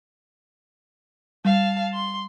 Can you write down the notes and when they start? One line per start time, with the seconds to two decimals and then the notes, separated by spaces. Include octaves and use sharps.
1.45 G3 F5 A5
1.94 C6